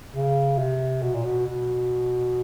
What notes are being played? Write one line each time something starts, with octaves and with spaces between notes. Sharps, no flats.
C#3
C3
B2
A#2
B2
B2